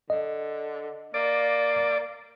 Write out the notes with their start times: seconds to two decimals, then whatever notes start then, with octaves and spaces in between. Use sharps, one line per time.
0.10 D3 D#5
1.14 A#3 D5